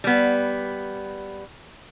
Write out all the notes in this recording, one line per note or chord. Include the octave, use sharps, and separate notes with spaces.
G3 B3